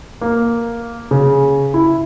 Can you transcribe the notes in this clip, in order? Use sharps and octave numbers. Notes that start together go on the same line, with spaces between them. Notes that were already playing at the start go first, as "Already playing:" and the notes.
A#3
C#3
E4